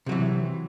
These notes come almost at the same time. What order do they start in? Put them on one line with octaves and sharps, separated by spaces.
C3 F#3 E3